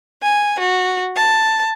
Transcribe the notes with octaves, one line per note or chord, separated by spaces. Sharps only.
G#5
F#4
A5